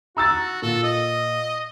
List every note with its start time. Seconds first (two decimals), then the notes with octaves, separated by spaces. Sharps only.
0.17 F#4 A#5 E6 A6
0.62 A#2 A4
0.83 D#5